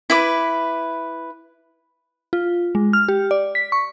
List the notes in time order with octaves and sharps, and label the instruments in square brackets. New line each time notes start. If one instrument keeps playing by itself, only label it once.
[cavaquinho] E4 B4 D6
[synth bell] F4
G#3
F6
G4
D5
B6
C#6